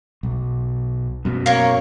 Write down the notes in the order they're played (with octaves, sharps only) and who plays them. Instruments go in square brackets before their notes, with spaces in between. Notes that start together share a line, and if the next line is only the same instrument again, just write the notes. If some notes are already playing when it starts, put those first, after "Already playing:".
[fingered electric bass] B1
F#2 B2
[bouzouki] A#3 C#5